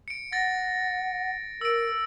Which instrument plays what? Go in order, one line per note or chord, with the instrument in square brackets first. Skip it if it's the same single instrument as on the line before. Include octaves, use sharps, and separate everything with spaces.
[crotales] C#7 D7
[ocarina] F#5 [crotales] A6 A#6
[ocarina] A#4 [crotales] E6 D7